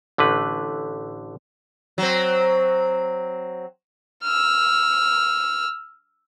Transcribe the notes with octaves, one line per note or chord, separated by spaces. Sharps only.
A1 D3 A3 B4
F#3 C4
E6 F6